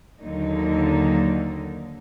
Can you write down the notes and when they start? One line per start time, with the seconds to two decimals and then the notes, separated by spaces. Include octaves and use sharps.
0.22 D#2 D3 F#3 A#3 D#4